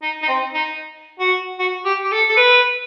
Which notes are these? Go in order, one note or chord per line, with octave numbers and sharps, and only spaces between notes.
D#4
D#4
C4
D#4
F#4
F#4
G4
G4
A4
A4
B4